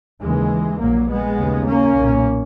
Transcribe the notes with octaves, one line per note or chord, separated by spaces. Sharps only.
D#2 C#3 E3 G#3
A#1 A#2 F#3 A#3
G#3 B3
D#2 C#3
A#3 C#4
B1 A#2